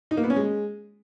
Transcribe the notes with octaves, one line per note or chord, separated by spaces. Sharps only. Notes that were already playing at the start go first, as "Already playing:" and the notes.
D#4
A#3
B3
C#4
G#3